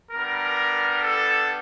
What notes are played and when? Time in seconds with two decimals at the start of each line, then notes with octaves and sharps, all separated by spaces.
0.11 G3 B3 D4 A#4
1.00 A4